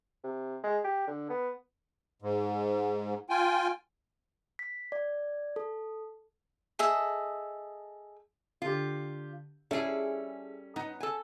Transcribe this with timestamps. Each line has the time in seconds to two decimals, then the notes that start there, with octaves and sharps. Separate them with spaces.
0.24 C3
0.63 G#3
0.84 G4
1.07 D3
1.30 B3
2.22 G#2
3.30 F4 G5 G#5
4.59 B6
4.92 D5
5.56 A4
6.79 G#4 A4 D#5 E5
8.62 D3 F4 G4
9.71 G3 C#4 E4 G#4 A4
10.76 B3 D#4
11.00 A4 G#5